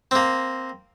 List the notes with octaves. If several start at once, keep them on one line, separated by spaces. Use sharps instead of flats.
A#3 C4